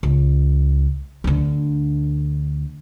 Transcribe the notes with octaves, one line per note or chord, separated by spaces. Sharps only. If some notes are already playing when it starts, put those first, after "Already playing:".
C#2
D2 D3